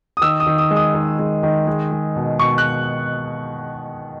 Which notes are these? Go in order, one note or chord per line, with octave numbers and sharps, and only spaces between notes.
D#6
D#3 E6
D#6
D#3
D#6
G#3
D#6
D#3
G#3
D#3
G#3
G#3
B2
B2 C#6
F#6